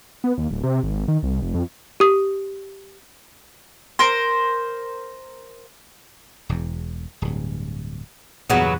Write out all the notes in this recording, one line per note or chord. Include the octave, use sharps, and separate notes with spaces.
B3
D#2
D1
C3
G#1
D#3
C2
F1
F2
G4 D#6
A#4 C5
E1 E2
D1 G2
E2 G2 A#2 C#3 F#3 B3